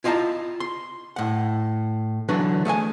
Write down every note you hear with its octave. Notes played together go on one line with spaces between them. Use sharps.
E4 F4 D#5 F#5 A5 A#5
C6
A2 F#5
D3 E3 F#3 D4 B4
A3 G#4 E5 G#5